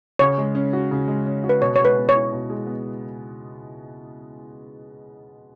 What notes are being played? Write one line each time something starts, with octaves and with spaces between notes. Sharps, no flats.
C#3 C#5
G#3
C#4
F#4
C#3
G#3
C#4
F#4
B4
B2 C#5
G#3 C#5
B4
B3
C#5
E4
B2
G#3
B3